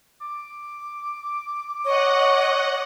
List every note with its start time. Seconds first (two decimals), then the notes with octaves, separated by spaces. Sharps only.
0.22 D6
1.85 C#5 D#5 F#5